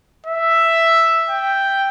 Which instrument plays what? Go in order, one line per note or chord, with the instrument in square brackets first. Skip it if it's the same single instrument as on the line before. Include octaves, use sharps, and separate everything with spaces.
[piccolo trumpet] E5
G5